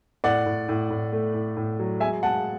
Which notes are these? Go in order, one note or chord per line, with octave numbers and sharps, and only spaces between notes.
A2 D5 F#5
A2
A2
A2
A3
A2
A2
F#3
G#3 E5 G#5
G#3 F#5 A5